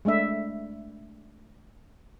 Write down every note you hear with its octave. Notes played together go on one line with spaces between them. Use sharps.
G#3 A3 D4 E5